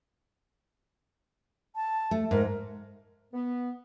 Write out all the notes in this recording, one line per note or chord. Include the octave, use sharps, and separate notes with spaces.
A5
A3
G#2 A#4
B3